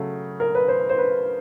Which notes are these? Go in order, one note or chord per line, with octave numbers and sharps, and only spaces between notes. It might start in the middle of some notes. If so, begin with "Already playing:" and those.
Already playing: C#3 F#3 A3
A#4
B4
C5
C5
B4